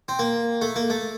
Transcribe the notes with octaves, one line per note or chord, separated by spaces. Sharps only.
C4
A#3
A3
A#3
A3